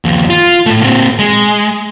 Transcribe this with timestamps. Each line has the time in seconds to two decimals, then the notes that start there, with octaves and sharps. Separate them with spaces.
0.05 D#2 F3
0.30 F4
0.66 A2 A3
0.82 A#2 C4
1.19 G#3